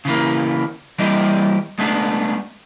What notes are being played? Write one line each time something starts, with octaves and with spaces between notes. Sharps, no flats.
C#3 E3 A#3
E3 G3 A#3 E4 G4 D#5
G#3 A3 B3 D4